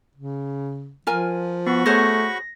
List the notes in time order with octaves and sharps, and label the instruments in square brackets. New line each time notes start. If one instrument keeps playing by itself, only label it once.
[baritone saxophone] C#3
[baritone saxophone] F3 [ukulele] F4 A#4 G#5
[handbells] B3 [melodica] F#4 B5 C#6
[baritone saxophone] A3 [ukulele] G#4 C5 C#5 [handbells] A#6